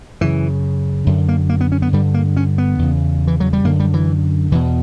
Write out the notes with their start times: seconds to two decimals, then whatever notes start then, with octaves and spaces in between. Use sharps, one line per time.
0.21 F#2 C#3 E3
1.06 F#2 D3
1.29 A#3
1.49 A#3
1.61 B3
1.72 C#4
1.82 B3
1.93 G2 D3 G3
2.14 A#3
2.37 C#4
2.58 B3
2.79 E2 C#3
3.27 E3
3.40 F#3
3.53 G3
3.65 F#2 D3 A#3
3.80 G3
3.94 E3
4.52 E2 E3
4.55 B2